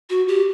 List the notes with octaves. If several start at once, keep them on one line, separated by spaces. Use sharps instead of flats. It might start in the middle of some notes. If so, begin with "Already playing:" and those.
F#4
G4